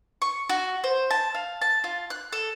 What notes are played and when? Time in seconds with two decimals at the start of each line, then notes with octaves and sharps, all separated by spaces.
0.22 C#6
0.49 F#4
0.84 C5
1.11 A5
1.35 F5
1.62 A5
1.84 F4
2.10 F#6
2.33 A4